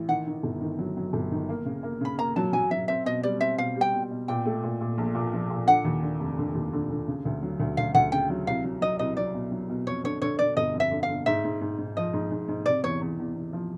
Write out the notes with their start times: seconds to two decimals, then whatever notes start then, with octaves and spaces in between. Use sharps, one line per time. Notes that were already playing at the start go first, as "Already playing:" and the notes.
Already playing: A1
0.08 D#3 F#5
0.27 D#3
0.43 G1
0.61 D#3
0.78 F#3
0.97 F#3
1.13 G1
1.31 D#3
1.49 A#3
1.65 C#3
1.83 A#3
2.01 C#3 B5
2.18 A#3 A#5
2.36 F#3 A5
2.53 F#3 G#5
2.71 F#3 E5
2.88 C4 E5
3.06 B2 D#5
3.23 G3 D5
3.40 C4 E5
3.58 B2 F5
3.76 G3
3.81 G5
3.94 B2
4.11 B2
4.28 A#2 G5
4.45 A3
4.63 A#2
4.81 A#2
4.98 A#1
5.15 A#2
5.33 F3
5.50 A#2
5.67 D3 F#5
5.85 D#2
6.02 D3
6.20 F1
6.38 D3
6.55 D#2
6.73 D3
6.90 D3
7.08 C#3
7.25 D2
7.42 F#3
7.60 D2
7.77 D2 F5
7.95 D2 F#5
8.12 C#3 G5
8.30 F#3
8.47 C2 F5
8.64 F#3
8.81 F#3 D#5
8.99 C2 D#5
9.17 F#3 D5
9.34 B2
9.52 F#3
9.69 B2
9.87 F2 C#5
10.04 D3 C#5
10.22 D3 C#5
10.39 D3 D5
10.57 G1 D#5
10.74 F2
10.80 E5
10.91 D3
11.03 F5
11.09 D3
11.26 G#2 E5
11.45 G#2
11.61 G#2
11.78 G#2
11.97 F3 D#5
12.13 G#2
12.31 G#2
12.48 G#2
12.66 C3 D5
12.84 E2 C#5
13.01 E2
13.19 E2
13.36 E2
13.53 F3